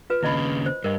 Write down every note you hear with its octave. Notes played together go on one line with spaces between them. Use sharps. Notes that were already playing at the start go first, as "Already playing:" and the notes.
F4 B4
D#2 C#3 E4 D#5 B5
C5
G2 A#4 D#5